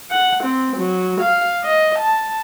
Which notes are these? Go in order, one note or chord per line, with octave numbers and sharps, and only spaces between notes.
F#5
C4
F#3
F5
D#5
A5